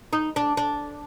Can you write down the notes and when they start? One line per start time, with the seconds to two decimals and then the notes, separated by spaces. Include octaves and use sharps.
0.13 D#4
0.36 D4
0.57 D4